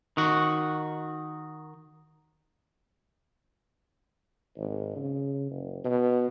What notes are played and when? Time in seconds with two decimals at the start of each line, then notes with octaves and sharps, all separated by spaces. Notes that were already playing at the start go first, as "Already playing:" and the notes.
0.17 D#3 F#4
4.57 G#1
4.96 C#3
5.51 F#1
5.85 B2